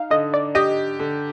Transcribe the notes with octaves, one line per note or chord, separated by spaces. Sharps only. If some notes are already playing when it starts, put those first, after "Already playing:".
Already playing: D#4 F5
D3 D#5
D5
G4 D#5
D3